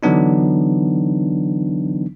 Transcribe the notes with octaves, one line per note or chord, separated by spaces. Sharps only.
D3 E3 F#3 B3 D4 D#4